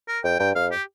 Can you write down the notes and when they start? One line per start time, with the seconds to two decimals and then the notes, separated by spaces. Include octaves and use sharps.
0.08 A#4
0.24 F2 G5
0.40 G2 G5
0.55 F2 F5
0.71 G4